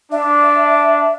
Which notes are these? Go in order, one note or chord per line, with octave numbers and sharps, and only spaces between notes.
D4 E5